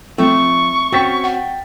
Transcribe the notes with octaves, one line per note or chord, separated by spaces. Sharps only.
F3 A3 C4 C#6
C4 C#4 F#4 G5 A6 B6
F#5